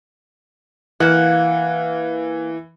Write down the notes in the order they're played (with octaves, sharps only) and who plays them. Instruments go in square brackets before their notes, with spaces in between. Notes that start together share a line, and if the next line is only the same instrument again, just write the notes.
[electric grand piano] E3 [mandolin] A#3 F#5